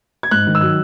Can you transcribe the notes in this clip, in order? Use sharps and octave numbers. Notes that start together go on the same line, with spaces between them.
G#6
G#2 F#6
D#3
E6
F#3 F#6